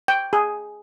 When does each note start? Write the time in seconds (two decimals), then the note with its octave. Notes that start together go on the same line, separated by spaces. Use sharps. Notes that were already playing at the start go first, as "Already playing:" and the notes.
0.08 G5
0.33 G#4